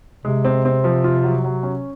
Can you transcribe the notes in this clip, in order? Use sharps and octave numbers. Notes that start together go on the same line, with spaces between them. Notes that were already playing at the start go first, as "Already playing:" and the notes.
C3 G#3
C4
C4
F3
F4
F#3
F#3
C#4